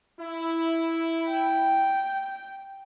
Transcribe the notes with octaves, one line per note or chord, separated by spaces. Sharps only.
E4
G5